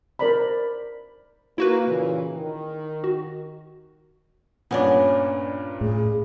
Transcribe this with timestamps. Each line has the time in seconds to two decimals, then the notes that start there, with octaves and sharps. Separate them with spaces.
0.19 A#4 C5 D5 A#5 B5
1.58 A#3 E4 F#4 B4
1.87 A#2 C#3 E3
2.32 D#3
3.04 F#4
4.71 G2 A#2 B3 C#4 D4
5.81 A2 G#4